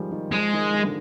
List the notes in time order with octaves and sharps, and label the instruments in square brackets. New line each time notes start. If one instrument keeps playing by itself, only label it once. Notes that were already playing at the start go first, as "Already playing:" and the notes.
Already playing: [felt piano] D#3 F3 G3 G#3
D#3
[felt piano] F3 [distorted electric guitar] G#3
[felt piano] D#3
D#3
D3